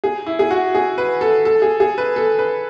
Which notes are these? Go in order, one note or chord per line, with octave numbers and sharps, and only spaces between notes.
G#4
E4
G#4
F#4
G#4
B4
A4
A4
G#4
G#4
B4
A4
B4